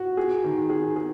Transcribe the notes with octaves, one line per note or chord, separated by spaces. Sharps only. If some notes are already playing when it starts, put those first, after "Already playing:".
Already playing: F#4
G#4
D#3
G#4
G#4